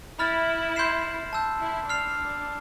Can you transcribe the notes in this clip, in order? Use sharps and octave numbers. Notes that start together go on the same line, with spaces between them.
E4 B5 F6 A6
C6 G6 C7 E7
A5 E6 G6
E4
D4 F6 C7 F7